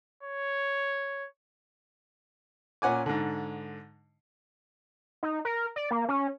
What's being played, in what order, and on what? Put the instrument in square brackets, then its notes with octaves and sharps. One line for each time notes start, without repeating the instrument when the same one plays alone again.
[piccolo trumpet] C#5
[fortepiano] A#2 C#4 F#5 G#5 D6
G#2 D3
[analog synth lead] D#4
A#4
D5
A#3
C#4